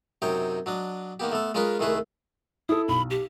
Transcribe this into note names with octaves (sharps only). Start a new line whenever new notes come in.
F#2 C3 D#4 C#5 D#5 G5
F#3 D4 D#5
D#3 A#3 B3 G4
A3 B3 A4
G#3 C#4 F4 A#4 B4 D#5
C2 D#3 A3 G#4 B4
E4 A4 D#6
B1 B5
G4